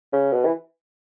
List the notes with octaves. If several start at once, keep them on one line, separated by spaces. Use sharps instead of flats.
C#3
B2
E3